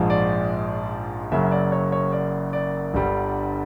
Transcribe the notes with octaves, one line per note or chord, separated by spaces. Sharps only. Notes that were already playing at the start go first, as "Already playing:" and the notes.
Already playing: A#1 G#2 F3 G#3
D5
F#1 F#2 C#3 F#3 E5
D5
C#5
C#5
D5
D5
G1 G2 D3 G3